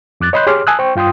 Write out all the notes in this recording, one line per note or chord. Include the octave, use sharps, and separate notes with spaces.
F2 D6 F#6 A6
C#5 D#5 B5 C6 F#6 G6
G4 G#4 C#5 C6 D6 F6
G#5 A5 D#6 E6 F#6
C5 G5 C#6
G2 F4 G5 C6 D#6